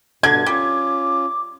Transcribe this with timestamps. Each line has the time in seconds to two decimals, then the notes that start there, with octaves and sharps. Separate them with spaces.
0.23 G2 B2 D3 G#6
0.46 G3 C#4 F4 D6